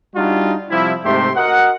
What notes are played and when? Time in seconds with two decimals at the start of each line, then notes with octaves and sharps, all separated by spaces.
0.15 G3 D4 D#4 F4 F#4
0.70 C3 F3 G3 E4
1.04 G#2 C3 A3 G4 E5 C6
1.36 F#4 A#4 D#5 F#5